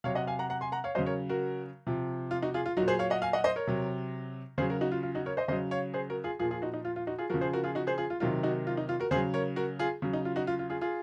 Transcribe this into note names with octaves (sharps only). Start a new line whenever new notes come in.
C3 F#3 C#5 F5
D#5 F#5
F5 G#5
F#5 A#5
F#5 A#5
G#5 C6
F#5 A#5
C#5 F5
C#3 F#3 C5 D#5
A#4 C#5
F#4 A#4
C3 F3
F4
D#4 F#4
F4 G#4
F4
A#2 F#3 D#4 F#4
G#4 C5
C#5 F5
D#5 F#5
F5 G#5
D#5 F#5
C5 D#5
A#4 C#5
C3 F#3
C#3 F#3 G#4 C5
F#4 A#4
D#4 F#4
F4
F4
D#4 F#4
A#4 C#5
C5 D#5
C#3 F#3 C5 D#5
C#5 F5
G#4 C5
F#4 A#4
F4 G#4
A#2 F3 F4 G#4
F4 G#4
D#4 F#4
D#4
F4
F4
D#4 F#4
F4 G#4
C#3 F3 F#4 A#4
G#4 C5
F#4 A#4
F4 G#4
D#4 F#4
G#4 C5
F4 G#4
F4
C3 D#3 F#3 F4
D#4 F#4
F4
D#4
F4
F#4 A#4
C#3 G#4 C5
F#3
A#4 C#5
F#4 A#4
F4 G#4
C#3 F#3
D#4
F4
D#4 F#4
F4
F4
F4 G#4
F4 G#4